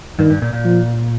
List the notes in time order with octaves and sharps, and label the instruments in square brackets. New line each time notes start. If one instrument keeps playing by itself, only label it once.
[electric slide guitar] G2 [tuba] D#3
[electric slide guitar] G2
A#2
A#2
[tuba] F3